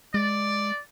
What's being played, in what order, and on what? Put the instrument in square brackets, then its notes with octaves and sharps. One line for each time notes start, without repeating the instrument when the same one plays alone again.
[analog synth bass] G#3 [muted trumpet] D5